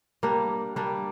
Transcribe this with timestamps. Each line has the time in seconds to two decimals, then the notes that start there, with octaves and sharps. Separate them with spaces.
0.23 G3 A#3 D4
0.76 G3 A#3 D4